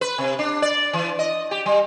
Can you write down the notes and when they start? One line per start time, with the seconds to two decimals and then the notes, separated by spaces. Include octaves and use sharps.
0.01 B4
0.18 C3
0.39 D4
0.62 D5
0.93 E3
1.19 D#5
1.51 G4
1.66 G3